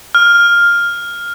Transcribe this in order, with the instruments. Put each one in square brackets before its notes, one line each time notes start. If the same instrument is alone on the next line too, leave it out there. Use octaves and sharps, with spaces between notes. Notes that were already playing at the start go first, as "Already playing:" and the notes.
[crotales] F6